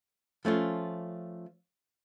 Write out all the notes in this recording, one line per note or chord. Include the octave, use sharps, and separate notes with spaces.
F3 A3 C#4 F4